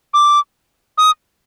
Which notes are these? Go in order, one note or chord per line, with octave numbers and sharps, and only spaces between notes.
D6
D#6